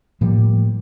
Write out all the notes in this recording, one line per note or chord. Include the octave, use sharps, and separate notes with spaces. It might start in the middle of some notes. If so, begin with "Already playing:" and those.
A2 F3 G3 A#3